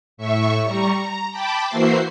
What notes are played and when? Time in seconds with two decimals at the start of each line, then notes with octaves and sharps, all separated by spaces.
0.17 A2 E5 C#6
0.63 G3 A#5 C#6
0.97 A#5
1.31 G5 A5 B5 D6
1.68 E3 A#3 F#4 C5 E5 C7